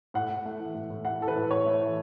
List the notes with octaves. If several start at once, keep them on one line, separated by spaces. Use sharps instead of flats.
A2 F#5
A2
A3
E3
A2
A2
A3 F#5
E3 A4
B4
A2
A2 C#5
A3
E3